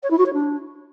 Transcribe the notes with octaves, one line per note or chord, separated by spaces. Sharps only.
C#5
E4
F#4
C#5
D4